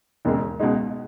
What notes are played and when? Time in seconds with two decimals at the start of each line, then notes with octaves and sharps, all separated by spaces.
0.25 E1 D#2 C#3 G#3
0.59 C#2 B2 G#3 D#4